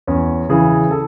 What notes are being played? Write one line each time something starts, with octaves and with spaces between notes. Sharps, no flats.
E2 C#4
C#3 E3 G#4
A4